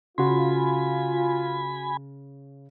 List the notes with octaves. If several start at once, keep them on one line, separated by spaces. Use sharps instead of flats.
C#3 F4 F#4 G#5 B5 C6